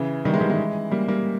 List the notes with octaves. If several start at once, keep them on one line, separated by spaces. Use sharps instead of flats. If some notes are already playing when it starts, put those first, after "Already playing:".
Already playing: C#3 E3
D#3 G3
E3 G#3
D#3 G3
E3 G#3
G3 A#3
G3 A#3